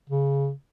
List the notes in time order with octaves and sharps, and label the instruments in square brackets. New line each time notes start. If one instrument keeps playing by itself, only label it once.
[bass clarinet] C#3